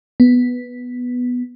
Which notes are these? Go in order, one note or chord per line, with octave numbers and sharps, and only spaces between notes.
B3